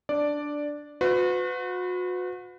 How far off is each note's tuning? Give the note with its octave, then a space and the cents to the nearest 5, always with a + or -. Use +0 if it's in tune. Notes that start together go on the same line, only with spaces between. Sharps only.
D4 +0 D5 +0
F#4 -35 B4 +30